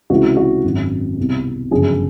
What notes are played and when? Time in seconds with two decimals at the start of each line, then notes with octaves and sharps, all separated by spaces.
0.10 C#2 C3 E3 F#4
0.37 F#4
0.64 G#1 F#2 D#3
1.18 C2 B2
1.71 G1 F#2 C#3 F3 G#4